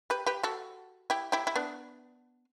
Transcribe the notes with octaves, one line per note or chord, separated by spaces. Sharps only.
G4 B4
G4 B4
F#4 A4
E4 G4
E4 G4
E4
B3 D4